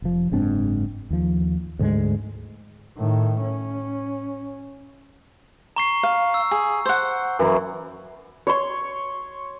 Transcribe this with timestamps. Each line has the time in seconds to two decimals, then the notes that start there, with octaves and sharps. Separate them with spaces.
0.02 F1 F3
0.31 F#1 G#2 C4 D4
1.10 D#2 F3
1.79 D2 G#2 F#3 G#3
2.98 A2 D#3
3.40 C#4
5.76 A#5 C#6 C7
6.03 F5
6.34 E6
6.51 G#4
6.86 C5 F#5
7.39 F#2 E3
8.47 C#5 C6